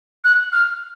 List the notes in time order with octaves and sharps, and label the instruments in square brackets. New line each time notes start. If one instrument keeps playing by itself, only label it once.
[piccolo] F#6
F6